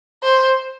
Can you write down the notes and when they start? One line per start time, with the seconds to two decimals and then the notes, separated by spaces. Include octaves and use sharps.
0.23 C5